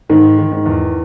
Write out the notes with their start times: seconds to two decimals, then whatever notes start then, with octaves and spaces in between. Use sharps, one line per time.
0.10 G#2 D#3
0.38 D#3
0.52 G#2
0.65 E2